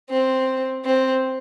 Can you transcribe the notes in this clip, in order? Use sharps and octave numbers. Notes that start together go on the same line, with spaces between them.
C4
C4